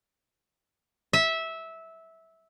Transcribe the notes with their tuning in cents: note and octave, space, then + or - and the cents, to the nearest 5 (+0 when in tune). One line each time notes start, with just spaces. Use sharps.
E5 -15